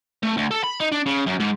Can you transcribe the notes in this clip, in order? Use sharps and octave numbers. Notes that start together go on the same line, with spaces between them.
A3
D2
A4
B5
D#4
D4
C#3
F#2
G#2